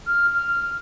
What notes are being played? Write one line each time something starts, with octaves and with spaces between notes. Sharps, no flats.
F6
F6